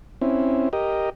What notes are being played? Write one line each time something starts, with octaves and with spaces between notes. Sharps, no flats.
C4 C#4 E4
G4 A#4 D#5